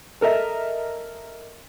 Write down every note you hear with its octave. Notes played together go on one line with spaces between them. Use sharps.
A4 A#4 D#5 E5